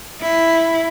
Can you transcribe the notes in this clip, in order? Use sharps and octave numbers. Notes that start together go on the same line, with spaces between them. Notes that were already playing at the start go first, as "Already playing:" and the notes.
E4